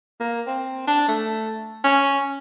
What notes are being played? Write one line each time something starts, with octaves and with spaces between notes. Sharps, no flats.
A#3
C4
D4
A3
C#4